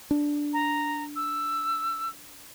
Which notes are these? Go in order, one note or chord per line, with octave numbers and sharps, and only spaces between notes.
D4
A#5
E6